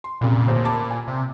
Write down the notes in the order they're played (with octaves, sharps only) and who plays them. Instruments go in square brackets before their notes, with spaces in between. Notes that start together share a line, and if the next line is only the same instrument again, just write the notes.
[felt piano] C6
[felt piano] C2 F2 C#3 [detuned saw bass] A#2
[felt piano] D#1 A1 C5
A5 B5 D6
G#5
[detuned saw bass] C3